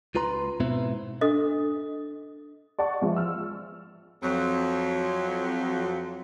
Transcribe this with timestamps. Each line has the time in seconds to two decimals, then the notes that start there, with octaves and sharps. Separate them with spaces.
0.15 C#2 F4 B4 A#5 C6
0.60 G#2 B2 B3 C4 E4
1.21 D4 A4 D#5
2.79 D5 F#5 A5 C#6
3.01 E3 F3 G#3
3.16 E6 F6
4.23 F2 F#3